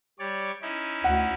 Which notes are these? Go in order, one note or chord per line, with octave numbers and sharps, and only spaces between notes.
G3 C#5 D5
C#4 D#4 E4
D2 F#5